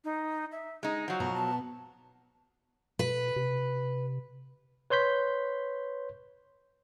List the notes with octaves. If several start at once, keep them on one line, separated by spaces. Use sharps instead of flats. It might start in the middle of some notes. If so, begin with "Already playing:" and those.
D#4
E5
G#3 D#4 D#5
F3 F#3 F#5
B2 B3 A#5
A5
B2 B4
C3
B4 C#5 C6 G6 B6